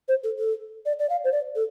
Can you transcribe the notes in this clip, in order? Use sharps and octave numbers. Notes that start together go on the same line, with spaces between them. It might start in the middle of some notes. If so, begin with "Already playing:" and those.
C5
A4
A4
D5
D5
F5
C5
D5
A4